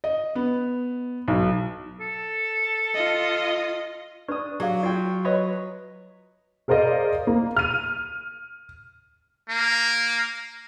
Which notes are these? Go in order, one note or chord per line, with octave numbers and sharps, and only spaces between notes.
D#5
B3
B1
A4
F4 D#5
D4 B4 D5 C#6 D#6
F#3 G4 G#4 F5
F4 D5 G5
B4 C#5 D#5
G#4 A#4 C5 D5 D#5 F5
A#3
F6 D#7
A#3